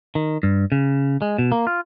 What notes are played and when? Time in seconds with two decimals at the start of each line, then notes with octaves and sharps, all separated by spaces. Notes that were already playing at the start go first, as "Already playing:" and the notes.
0.15 D#3
0.43 G2
0.72 C#3
1.22 G#3
1.38 B2
1.52 A#3
1.67 F4